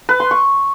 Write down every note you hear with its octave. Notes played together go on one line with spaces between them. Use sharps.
B4
C6
C#6